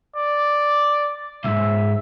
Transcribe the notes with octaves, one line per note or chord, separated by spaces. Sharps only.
D5
C#2 G#2 E5